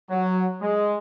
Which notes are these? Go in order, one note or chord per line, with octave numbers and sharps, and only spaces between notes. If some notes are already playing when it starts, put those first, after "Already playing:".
F#3
G#3